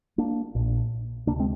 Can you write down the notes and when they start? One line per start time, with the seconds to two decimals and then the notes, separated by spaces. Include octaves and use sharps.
0.18 A#3 D4
0.55 A#1 A#2
1.27 D2 C3 A#3 D4
1.39 G#3 C4